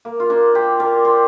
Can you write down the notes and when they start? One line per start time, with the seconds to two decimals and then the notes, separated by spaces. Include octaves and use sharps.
0.05 A#3
0.20 F4
0.30 A#3 D4
0.55 G4 C5
0.80 A#4 D5
1.05 G4 C5